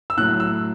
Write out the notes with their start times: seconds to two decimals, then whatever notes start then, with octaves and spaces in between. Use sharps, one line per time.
0.10 E6
0.18 A2 F#3 F#6
0.40 E6